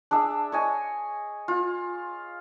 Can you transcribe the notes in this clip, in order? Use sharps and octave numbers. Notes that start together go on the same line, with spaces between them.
D4 G#4 E5
C#5 D#5 G#5
F4